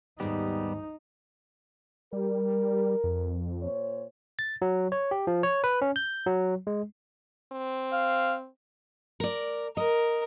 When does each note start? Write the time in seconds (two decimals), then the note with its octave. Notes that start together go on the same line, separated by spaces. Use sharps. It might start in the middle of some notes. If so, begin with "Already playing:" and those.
0.20 D#2 G#2 G3 B3 D#4 G4
2.13 G3 A#4
3.04 F2
3.61 A#2 C5 C#5
4.39 A6
4.62 F#3
4.92 C#5
5.11 G4
5.27 F3
5.43 C#5
5.64 B4
5.82 C#4
5.96 G6
6.26 F#3
6.67 G#3
7.52 C4
7.92 F5
9.20 A#4 D5
9.77 A#4 D#5